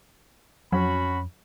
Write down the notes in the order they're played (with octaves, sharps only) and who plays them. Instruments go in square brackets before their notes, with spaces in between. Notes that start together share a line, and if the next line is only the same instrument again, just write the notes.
[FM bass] F2 [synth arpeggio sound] F#3 [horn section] C#4 F#4 [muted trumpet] B5